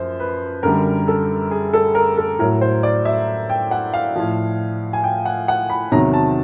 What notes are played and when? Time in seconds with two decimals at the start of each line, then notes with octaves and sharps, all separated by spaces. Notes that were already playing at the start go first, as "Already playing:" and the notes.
Already playing: F#2 F3 C5
0.20 B4
0.63 F#2 D3 G3 A#4
1.08 A4
1.51 G#4
1.73 A4
1.95 A#4
2.18 A4
2.39 A2 F#3 A#4
2.61 C5
2.83 D5
3.05 E5
3.50 G5
3.71 F#5
3.94 F5
4.16 A2 F3
4.93 G#5
5.04 G5
5.26 F#5
5.48 F#5
5.70 B5
5.92 E2 C3 D#3 F#3 A#5
6.13 A5